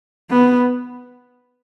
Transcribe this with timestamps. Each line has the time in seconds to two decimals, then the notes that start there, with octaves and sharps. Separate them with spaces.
0.30 B3